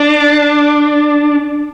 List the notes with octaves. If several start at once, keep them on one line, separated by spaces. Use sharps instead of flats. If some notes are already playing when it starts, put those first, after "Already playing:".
Already playing: D4